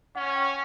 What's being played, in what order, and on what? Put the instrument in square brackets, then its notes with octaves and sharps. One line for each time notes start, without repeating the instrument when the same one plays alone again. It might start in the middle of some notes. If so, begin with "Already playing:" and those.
[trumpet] C#4 [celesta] F#5
[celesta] G5